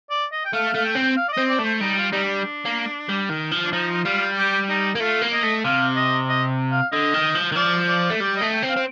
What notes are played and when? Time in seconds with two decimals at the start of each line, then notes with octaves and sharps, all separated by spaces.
0.10 D5
0.32 D#5
0.45 G5
0.53 A3 F5
0.74 A3 F5
0.84 G5
0.95 C4
1.16 F5
1.28 D5
1.32 D#5
1.38 C4
1.49 D5
1.59 A3
1.64 C5
1.81 G3 D#4
1.98 F4
2.11 G3 D#4
2.24 D4
2.66 A#3
3.09 G3
3.29 D#3
3.51 F3
3.65 D4
3.72 F3 D#4
3.94 D#4
4.04 G3 F4
4.37 G4
4.69 D#4
4.95 A#3
5.00 A3 F4
5.22 A#3
5.32 D#5
5.43 A3
5.64 C3 F5
5.96 D#5
6.29 D#5
6.71 F5
6.92 D3 D#5
7.14 D#3
7.35 F3
7.52 D#3
7.56 F3 D5
7.88 D5
8.10 A3
8.20 G3 D5
8.36 A3 D#5
8.52 G5
8.62 C4
8.68 F5
8.76 C4